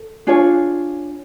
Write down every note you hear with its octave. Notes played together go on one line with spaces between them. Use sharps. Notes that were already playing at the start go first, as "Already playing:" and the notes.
Already playing: A4
D4 F4 G#4 C#5